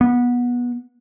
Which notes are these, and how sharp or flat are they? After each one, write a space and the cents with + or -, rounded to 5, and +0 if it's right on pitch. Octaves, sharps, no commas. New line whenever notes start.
B3 -20